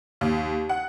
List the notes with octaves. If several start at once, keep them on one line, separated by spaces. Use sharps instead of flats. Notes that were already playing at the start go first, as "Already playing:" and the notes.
D#2
F#5